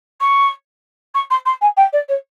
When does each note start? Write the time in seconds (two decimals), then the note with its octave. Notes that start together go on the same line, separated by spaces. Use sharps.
0.21 C#6
1.14 C#6
1.30 C6
1.46 C6
1.61 G#5
1.77 G5
1.93 D5
2.09 C#5